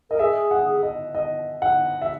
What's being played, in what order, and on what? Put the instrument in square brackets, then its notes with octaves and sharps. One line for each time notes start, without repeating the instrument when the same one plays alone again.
[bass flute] A#4 [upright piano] D#5
[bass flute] G#4 [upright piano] E5
[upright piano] F#5
D#5
D#5
F#5
E5